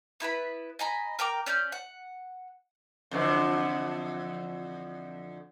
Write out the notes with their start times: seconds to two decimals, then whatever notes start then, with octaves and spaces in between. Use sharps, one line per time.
0.20 B3 E4 B4 B5
0.79 D#5 G#5 A#5 B5
1.19 A#4 G5 A#5 D6
1.46 C#4 D5 F6 G6
1.72 F#5
3.11 F2 D3 E3